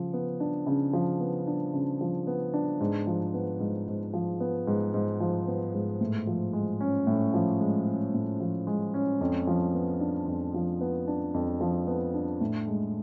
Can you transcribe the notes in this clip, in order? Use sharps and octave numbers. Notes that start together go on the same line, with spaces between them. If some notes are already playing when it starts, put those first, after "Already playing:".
Already playing: C#3 F3
B3
D4
C#3
F3
B3
D4
C#3
F3
B3
D4
G#2
F3
B3
G#2
G#2
F3
B3
G#2
G#2
F3
B3
G#2
A2
F3
G#3
C#4
A2
F3
G#3
C#4
A2
F3
G#3
C#4
F2
F3
B3
D4
F2
F3
B3
D4
F2
F3
B3
D4
A2
G#3